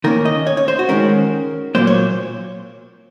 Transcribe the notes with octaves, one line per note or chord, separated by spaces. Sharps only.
D#3 A#3 C#4 A#4
D#5
C#5
C#5
C5
F#4
D#3 G#3 C#4 A#4
A#2 F#3 A#3 C5
C#5